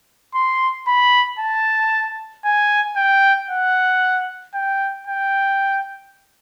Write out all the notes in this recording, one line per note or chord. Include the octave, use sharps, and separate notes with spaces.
C6
B5
A5
G#5
G5
F#5
G5
G5